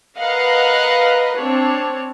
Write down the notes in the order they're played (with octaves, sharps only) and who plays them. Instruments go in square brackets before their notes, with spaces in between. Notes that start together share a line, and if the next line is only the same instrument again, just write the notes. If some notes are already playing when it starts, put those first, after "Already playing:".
[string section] A#4 B4 D#5 F5 F#5
C4 D4 C#5